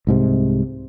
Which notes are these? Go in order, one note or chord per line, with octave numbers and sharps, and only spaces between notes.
C2 G#2 C3